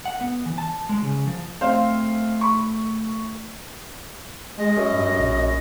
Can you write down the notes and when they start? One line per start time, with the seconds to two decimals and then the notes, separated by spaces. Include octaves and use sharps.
0.05 F#5
0.21 B3
0.46 E3
0.58 A5
0.89 G#3
1.02 C#3
1.27 F3
1.61 A3 C4 C5 F5
2.41 B5 C#6
4.57 G#3 D#5
4.77 F#2
4.93 G2
5.19 A#1